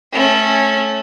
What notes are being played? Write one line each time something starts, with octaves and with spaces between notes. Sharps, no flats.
A3 C#4